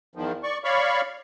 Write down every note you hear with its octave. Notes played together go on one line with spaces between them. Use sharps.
E2 D#3 F3
D5 C#6
C#5 D5 F5 B5 C#6